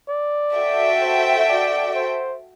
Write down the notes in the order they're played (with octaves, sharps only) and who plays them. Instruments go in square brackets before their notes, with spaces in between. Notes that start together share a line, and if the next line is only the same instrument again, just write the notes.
[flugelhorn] D5
[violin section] F#4 A4 E5 G5
[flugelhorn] C5
D5
C5